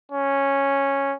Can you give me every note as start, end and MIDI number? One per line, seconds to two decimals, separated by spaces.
0.12 1.15 61